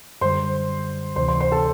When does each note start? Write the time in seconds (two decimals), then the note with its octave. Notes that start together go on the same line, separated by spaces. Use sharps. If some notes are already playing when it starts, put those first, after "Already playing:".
0.21 F#2 D3 G3 C5 C6
1.16 D2 C3 E3 C5 C6
1.28 C5 C6
1.41 C5 C6
1.52 A4 A5